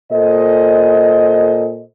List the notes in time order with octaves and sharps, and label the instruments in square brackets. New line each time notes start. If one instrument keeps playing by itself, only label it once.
[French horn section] A#2 A4 C5 D#5